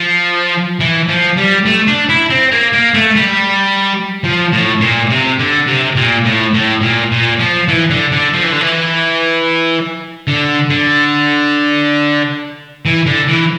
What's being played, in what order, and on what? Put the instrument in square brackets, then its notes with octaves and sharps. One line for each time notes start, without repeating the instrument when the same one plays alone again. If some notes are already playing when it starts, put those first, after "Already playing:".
Already playing: [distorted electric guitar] F3
E3
F3
G3
A3
D4
E4
C4
A#3
A#3
A3
G3
F3
A2
A#2
C3
D3
C3
A#2
A2
A2
A#2
A#2
F3
E3
D3
D3
F3
E3
D3
E3
D3
D3
E3
D3
E3